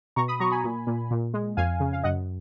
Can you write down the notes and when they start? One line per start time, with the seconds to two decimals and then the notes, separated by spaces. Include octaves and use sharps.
0.16 B2 A#5 C#6
0.28 B5 D#6
0.40 F#3 A#5 C#6
0.52 G#5 B5
0.64 A#2
0.87 A#2
1.11 A#2
1.34 G#3
1.57 F2 F5 G#5
1.80 C#3
1.93 F5
2.03 F#2 D#5 F#5